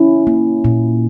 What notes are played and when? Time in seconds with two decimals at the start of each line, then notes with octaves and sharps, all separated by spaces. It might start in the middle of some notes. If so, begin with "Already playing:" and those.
Already playing: C#4 E4
0.27 A#3
0.65 A#2